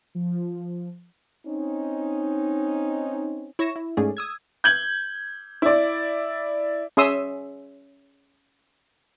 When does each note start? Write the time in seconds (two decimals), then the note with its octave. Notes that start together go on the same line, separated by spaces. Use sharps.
0.15 F3
1.46 C4 C#4 D#4
3.59 E4 C#5 C#6 A#6 E7
3.76 E4
3.97 G#2 A3 C#4 G#4 D5
4.17 D#6 E6 G#6
4.64 G6 G#6 F#7
5.62 E4 D5
6.97 C#4 G#4 E5 C6 D#6 E6